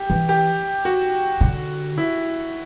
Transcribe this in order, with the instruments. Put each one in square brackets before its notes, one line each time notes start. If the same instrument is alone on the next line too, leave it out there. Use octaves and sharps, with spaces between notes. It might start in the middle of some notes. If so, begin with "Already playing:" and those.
Already playing: [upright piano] G4
[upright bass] E3
[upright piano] G4
F#4
[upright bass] D3
[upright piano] E4